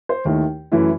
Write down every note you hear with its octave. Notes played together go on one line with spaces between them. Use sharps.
C5
D#2 D#3 A3 E4
F#2 E3 A3 E4